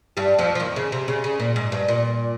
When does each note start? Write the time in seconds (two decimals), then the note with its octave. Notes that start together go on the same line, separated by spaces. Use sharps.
0.17 G2 G3
0.39 F2 F3
0.55 F3
0.60 D#2 D#3
0.76 C#3
0.92 C3
1.08 C#3
1.24 C#3
1.40 A#2
1.56 G#2
1.72 G2
1.88 A#2